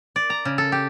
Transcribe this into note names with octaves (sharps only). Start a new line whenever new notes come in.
D5
A#5
C#3
A4
G4